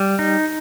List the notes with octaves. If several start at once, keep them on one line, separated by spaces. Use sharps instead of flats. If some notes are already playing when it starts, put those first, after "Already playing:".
Already playing: G3
D#4